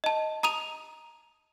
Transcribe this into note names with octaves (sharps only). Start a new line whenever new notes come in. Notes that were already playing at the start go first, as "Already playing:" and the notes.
D#5 A5
A#5 D#6 D#7 F7